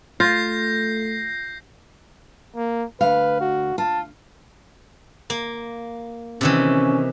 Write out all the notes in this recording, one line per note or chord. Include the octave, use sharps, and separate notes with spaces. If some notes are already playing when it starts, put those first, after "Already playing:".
A3 F4 G6 A#6 C7
A#3
D2 B4 F5
F#4
F4 A5
A#3
C3 D#3 E3 C#4